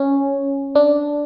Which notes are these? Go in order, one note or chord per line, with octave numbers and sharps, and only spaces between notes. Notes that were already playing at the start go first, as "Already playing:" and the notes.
Already playing: C#4
D4